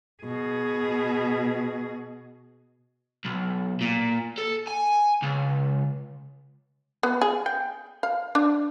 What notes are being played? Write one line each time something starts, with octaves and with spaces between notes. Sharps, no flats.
B2 G#4
B1
A#2
A4
G#5
C#2
B3
G#4
G5
F5
D4